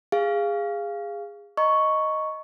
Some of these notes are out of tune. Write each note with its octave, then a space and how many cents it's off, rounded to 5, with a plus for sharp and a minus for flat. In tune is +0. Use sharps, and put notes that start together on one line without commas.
G#4 -20 F5 -10
D#5 +0 A#5 +0 C#6 +0